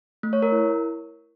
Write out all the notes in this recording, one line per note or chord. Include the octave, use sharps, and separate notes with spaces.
A3
C#5
A#4
E4